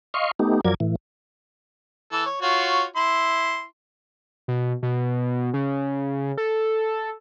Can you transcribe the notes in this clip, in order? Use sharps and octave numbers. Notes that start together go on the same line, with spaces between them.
D#5 F5 C6 C#6
A3 B3 D#4 G4
F#2 F3 F#3 A#4 D5 G#6
A2 E3
E3 A4
C#5
F4 F#4 C#5
E4 C6
B2
B2
C#3
A4